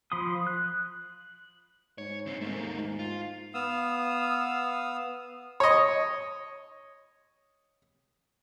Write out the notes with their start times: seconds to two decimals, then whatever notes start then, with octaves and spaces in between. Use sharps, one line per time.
0.12 F3 B5 C6 D#6
0.47 F#6
1.98 G#2 C#5
2.26 D3 C4
2.41 G#2 A3 A#3
2.62 D#2
2.78 G#2
2.99 F4
3.54 B3 F5 D#6 E6
5.60 C#5 D#5